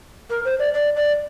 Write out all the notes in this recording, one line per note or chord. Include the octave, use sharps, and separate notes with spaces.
A#4
C5
D5
D5
D5